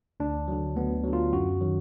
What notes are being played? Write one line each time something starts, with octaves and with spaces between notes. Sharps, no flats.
D2 D4
D3 F#3
D2 B3
D3 F#3
F4
F#2 F#4
D#3 F#3